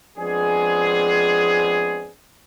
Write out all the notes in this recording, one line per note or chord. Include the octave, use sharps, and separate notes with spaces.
F3 G#3 B3 C4 D4 G#4